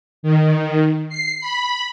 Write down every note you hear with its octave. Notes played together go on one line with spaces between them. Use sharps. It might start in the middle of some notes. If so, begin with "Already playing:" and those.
D#3
C7
B5